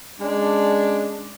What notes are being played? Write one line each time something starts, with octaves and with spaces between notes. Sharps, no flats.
G#3 C#4 D4